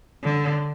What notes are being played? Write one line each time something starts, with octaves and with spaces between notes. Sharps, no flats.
D3